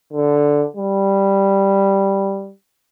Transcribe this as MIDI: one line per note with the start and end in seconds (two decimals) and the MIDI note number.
0.13 0.65 50
0.77 2.51 55